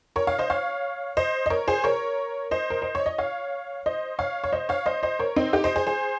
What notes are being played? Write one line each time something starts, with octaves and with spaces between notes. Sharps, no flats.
A#4 C#5
C#5 F5
C5 D#5
C#5 F5
C5 D#5
D#5
A#4 C#5
G#4 C5
A#4 C#5
C5 D#5
A#4
C5
C#5
D#5
C#5 F5
C5 D#5
C#5 F5
C#5
C5 D#5
C#5 F5
C5 D#5
C5 D#5
A#4 C#5
C4 D#4
D#4 G4
C5 D#5
G#4 C5
G#4 C5